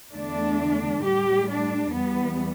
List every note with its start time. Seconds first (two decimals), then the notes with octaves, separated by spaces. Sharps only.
0.12 E2 D3 A3 D4
1.02 A2 G3 G4
1.48 D4
1.93 E2 E3 G3 B3